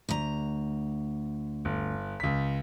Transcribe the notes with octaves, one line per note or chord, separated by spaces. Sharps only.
D2 A#5
G1
C#2 B6